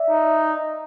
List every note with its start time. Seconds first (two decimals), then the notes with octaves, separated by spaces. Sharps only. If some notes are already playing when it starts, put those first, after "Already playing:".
Already playing: D5 E5
0.10 D#4